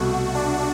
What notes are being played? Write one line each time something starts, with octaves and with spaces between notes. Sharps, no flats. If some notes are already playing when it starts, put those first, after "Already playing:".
Already playing: C2 B2 A3 F#4
D4